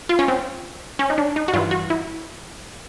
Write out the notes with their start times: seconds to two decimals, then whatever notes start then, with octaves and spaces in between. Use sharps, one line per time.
0.09 F4
0.19 C#4
0.28 C4
0.99 C#4
1.10 D#4
1.18 D4
1.36 D#4
1.48 F#4
1.53 G2 E3 F4
1.71 F#4
1.90 E4